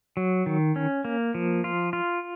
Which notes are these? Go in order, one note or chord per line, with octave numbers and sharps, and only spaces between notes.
F#3
D#3
C#4
A#3
F3
F4
F4